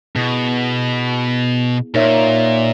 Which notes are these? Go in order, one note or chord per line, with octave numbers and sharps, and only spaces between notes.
B2 B3 E4 G#4
A#2 D#4 A#4 C#5 E5